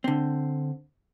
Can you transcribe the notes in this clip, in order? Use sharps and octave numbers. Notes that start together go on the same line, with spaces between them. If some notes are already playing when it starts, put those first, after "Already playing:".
D3 C4